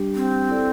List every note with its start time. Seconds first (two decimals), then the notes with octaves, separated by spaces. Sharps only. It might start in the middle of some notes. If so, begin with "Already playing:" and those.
Already playing: G3 D4 G4
0.15 C4
0.48 E4 A4 D5